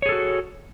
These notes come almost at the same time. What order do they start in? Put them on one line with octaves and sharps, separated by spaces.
C#5 G#4 A4 F#4